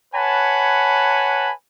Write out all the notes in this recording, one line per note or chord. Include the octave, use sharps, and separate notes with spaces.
B4 C#5 F#5 G#5 A5 B5